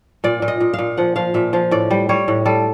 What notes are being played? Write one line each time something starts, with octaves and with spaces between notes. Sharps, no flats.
A#2 D5
A#2
D#5
A#2
A#2 F5
F3 F#5
F3 F5
A#2 E5
F3 F5
A2 D5
G3
G3 C#5
A2
G3 A4